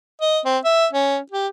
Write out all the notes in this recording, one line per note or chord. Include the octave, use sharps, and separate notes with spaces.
D#5
C4
E5
C#4
G4